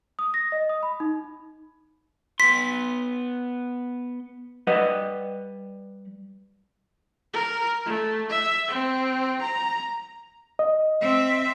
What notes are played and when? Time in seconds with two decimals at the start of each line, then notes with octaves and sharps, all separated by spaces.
0.19 D#6
0.34 A#6
0.52 D#5
0.69 D#6
0.83 B5
1.00 D#4
2.40 B3 C6 B6
4.67 G3 B4 D#5 F#5
7.33 A#4
7.85 A3
8.30 E5
8.68 C4
9.41 A#5
10.59 D#5
11.01 C4 E5